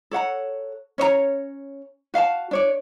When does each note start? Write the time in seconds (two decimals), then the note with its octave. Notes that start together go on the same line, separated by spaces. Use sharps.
0.11 A4 C#5 F#5 A#5
0.98 C#4 C#5 D#5 A#5
2.14 F#4 F5 G#5 A5
2.51 D4 C#5 D5